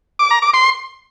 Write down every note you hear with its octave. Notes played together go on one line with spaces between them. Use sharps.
D6
A#5
D6
C6